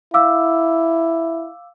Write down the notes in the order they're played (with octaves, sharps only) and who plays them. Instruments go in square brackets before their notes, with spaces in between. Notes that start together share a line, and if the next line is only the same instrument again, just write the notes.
[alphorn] E4 [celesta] F5 D6 E6